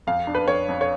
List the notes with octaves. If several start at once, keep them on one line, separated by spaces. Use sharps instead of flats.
F2 F5
D4
B4
F2 C#5
F2
C#5